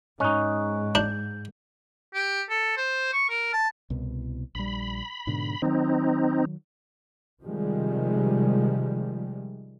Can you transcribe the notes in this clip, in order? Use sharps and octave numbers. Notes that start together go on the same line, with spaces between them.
G#2 C#4 D#4 D#5 C#6 F#6
D4 G6
G4
A4
C5
C#6
A#4
A5
C2 B2
A#1 G3 B5
G#2 B2 D3
D#3 F#3 C4 D#4
C3 D#3 F3 G3 G#3